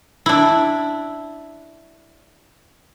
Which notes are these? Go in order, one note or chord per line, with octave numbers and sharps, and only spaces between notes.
D4 E4